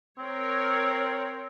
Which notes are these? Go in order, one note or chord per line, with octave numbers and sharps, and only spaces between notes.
C4 A#4 C#5